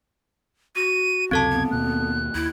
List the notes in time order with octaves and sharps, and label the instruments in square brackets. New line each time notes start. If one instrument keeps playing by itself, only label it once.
[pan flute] F#4 [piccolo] D#7
[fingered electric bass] C#2 F#2 C3 [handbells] C4 A4 A5 [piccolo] G#6
[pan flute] B3
[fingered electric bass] D#2 B2 A#3 [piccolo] F#6
[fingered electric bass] D#2 [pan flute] E4